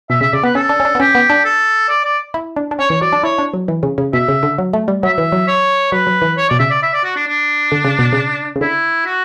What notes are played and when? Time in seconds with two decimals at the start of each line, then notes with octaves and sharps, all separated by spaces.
0.10 B2 E5
0.21 C#3 E5
0.33 C#3 D5
0.43 B3 B4
0.55 C#4 A4
0.69 D4
0.80 C#4
0.85 D4
0.95 B3
1.00 C#4 G4
1.15 B3
1.30 D4
1.45 A4
1.89 D5
2.04 D5
2.34 E4
2.56 D4
2.71 D4
2.79 C#4 C#5
2.90 E3 C#5
3.01 F#3 D5
3.13 D4
3.23 E4 C#5
3.38 D4
3.54 F#3
3.68 E3
3.83 C#3
3.98 C#3
4.13 B2 E5
4.28 C#3
4.43 D3
4.58 F#3
4.73 A3
4.88 G3
5.03 F#3 E5
5.18 E3
5.32 F#3
5.47 C#5
5.92 F#3 B4
6.07 F#3
6.22 E3
6.37 C#5
6.49 B2 D5
6.59 C#3 E5
6.71 D5
6.82 E5
6.93 D5
7.04 F#4
7.16 D4
7.27 D4
7.72 D3
7.85 C#3
7.99 B2
8.13 C#3
8.56 C#3
8.61 D3 E4
9.06 F#4